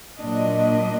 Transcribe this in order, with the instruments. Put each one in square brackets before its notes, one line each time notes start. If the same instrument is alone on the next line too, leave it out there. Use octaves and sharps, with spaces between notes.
[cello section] A#2 F#3 D4 D#5